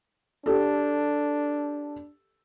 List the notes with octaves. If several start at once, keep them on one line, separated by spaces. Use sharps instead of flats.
D4 G4 A4